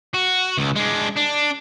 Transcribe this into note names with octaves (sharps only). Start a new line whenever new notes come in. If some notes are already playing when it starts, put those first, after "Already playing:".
F#4
C#2
G#3 D4
D4